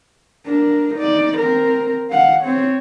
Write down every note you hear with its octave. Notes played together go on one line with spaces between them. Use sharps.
D4 A#4
D#4 D5
C4 A#4
F5 F#5
C4 C#5